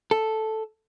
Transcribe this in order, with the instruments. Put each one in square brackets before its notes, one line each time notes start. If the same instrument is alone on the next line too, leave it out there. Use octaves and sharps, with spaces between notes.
[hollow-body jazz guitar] A4